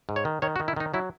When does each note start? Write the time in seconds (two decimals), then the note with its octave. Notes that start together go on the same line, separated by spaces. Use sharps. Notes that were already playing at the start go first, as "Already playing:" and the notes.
0.09 G#2
0.16 C#5
0.25 D#3
0.42 D#3 C#5
0.56 F#4
0.60 D#3
0.68 E4
0.76 D#3 D#4
0.94 F#3 E4